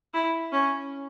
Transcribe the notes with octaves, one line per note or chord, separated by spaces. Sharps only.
E4
C#4